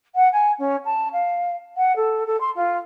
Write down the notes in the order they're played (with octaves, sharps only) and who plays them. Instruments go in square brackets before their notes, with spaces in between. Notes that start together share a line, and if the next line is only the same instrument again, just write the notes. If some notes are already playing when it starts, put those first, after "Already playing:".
[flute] F#5
G#5
C#4
A5
F5
F#5
A4
A4
C6
F4